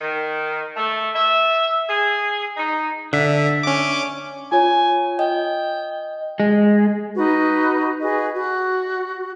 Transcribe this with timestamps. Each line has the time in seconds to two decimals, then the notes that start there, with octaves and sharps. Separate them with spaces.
0.01 D#3
0.76 A3
1.14 E5
1.88 G#4
2.57 D#4
3.13 D3 D4 E5
3.63 C#4 D6
4.52 F4 C#5 G#5
5.19 D#5 G5
6.40 G#3
7.15 D#4 F#4 B4
8.00 F#4 G#4 B4 D#5
8.33 F#4